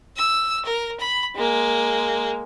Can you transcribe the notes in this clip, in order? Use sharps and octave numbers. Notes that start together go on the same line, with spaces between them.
E6
A#4
B5
G#3 A#3